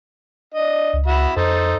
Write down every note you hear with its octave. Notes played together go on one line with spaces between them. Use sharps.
D4 D#5
C#2
F#4 E5 B5
F2 D#4 A4 C5